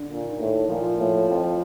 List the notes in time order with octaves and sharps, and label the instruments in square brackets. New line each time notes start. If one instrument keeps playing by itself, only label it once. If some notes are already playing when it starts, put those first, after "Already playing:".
Already playing: [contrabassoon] D3
[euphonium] A#2
[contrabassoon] D#3
[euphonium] A2
[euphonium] A#2 [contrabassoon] F3
[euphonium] A2
F2